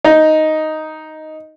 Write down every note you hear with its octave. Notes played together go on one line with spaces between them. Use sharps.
D#4